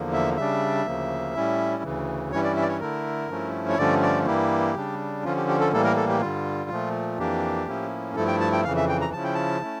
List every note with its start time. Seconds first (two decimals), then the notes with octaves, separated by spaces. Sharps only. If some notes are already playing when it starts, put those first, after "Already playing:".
Already playing: E2 D3 F3 A#3
0.13 E5
0.37 C#3 G3 D4 E5
0.86 D2 C#3 F3 A#3
1.35 A2 G3 C#4 E4
1.83 D2 C#3 E3
2.32 G2 E3 G3 C#4 E4 C#5
2.44 D5
2.56 E5
2.62 D5
2.69 C#5
2.80 D3 A3 E4 A#4
3.29 G2 F3 A3 C#4 E4
3.69 C#5
3.77 G2 D3 F3 A3 C#4 D5
4.02 D5
4.27 G2 E3 G3 A#3 E4 G4
4.75 C#3 G3 D4
5.24 D3 F3 C#4 F4
5.37 G4
5.48 G4
5.60 A4
5.73 A2 E3 G3 A#3 A4
5.84 A#4
5.97 A4
6.09 G4
6.21 G2 D3 G3 F4
6.70 A#2 F3 A3
7.18 F2 E3 A#3 D4 G4
7.67 A2 F3 A#3 C#4 E4
8.16 G2 F3 A3 E4 A4
8.28 G5
8.40 A5
8.53 G5
8.64 F2 C#3 E3 F5
8.77 E5
8.89 G5
9.01 A#5
9.13 C#3 F3 C#4 E4 A5
9.24 G5
9.35 A5
9.62 A3 C#4 E4